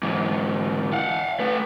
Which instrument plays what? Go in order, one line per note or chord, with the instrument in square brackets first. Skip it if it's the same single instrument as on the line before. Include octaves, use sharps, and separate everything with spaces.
[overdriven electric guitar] G#2 E3
F5 F#5
A3 B4